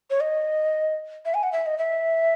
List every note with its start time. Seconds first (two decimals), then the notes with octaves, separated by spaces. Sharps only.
0.10 C#5
0.20 D#5
1.25 E5
1.34 G#5
1.43 F#5
1.52 E5
1.66 D#5
1.78 E5